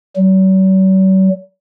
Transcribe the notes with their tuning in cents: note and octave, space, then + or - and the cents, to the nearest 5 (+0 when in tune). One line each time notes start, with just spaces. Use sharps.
F#3 +45